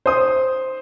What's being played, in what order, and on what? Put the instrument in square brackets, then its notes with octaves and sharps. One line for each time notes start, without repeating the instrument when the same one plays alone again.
[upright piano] C5 D#6